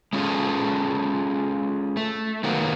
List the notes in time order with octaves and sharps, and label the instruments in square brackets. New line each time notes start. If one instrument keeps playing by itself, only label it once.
[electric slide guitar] G#3 C#4 F4 G#4 A4
A3
D#3 F#3 A#3 B3